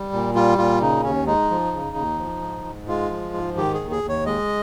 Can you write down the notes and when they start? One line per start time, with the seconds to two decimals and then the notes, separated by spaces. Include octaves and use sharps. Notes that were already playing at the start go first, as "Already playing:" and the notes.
Already playing: G3
0.13 A#2
0.34 G3 F4
0.58 A#2 F4
0.81 C#3 D#4
1.04 D#2 C#4
1.26 G#3 D#4
1.50 F3
1.72 C#3
1.96 D#2
2.19 F3
2.42 G#2
2.64 G#2
2.88 G#3 F4
3.10 F3
3.34 G#2
3.57 D#3 G4
3.74 G#4
3.79 D#2
3.91 G#4
4.03 D#2
4.09 C#5
4.26 G#3 D#5